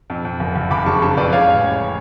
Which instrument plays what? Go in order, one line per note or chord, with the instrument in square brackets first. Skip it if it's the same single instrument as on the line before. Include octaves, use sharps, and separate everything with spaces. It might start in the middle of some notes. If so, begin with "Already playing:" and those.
[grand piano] F2
F2
F#1
F#1
F#1 B5 D6
C#3 A5 C#6
C#3 A5 C#6
F2 B4 D5
G#3 C#5 F5
A1
A1